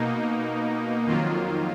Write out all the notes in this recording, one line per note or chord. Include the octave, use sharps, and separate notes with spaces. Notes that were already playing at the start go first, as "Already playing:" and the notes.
Already playing: B2 A#3 D#4
F2 D#3 F#3 A#3 F4